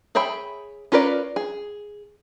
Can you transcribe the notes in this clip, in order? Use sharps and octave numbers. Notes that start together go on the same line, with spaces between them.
G#4 C#5 E5 G5 B5
C#4 F4 A#4 B4 D5
G#4